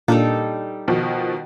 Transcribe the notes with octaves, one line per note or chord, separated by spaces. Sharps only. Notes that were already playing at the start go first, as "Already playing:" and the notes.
A#2 G3 A#3 D4 D#4 A4
B2 D#3 F3